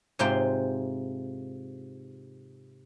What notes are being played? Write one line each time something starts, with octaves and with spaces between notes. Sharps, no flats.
G#2 C3 F4 C5 G5